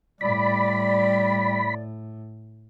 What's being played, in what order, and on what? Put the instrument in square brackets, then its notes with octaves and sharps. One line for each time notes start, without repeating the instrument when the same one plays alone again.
[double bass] A2 [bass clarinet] G3 [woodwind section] D5 [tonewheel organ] B5